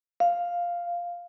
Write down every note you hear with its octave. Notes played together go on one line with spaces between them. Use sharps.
F5